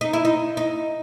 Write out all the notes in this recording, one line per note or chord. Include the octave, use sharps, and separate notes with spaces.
D#4
E4
D#4
D#4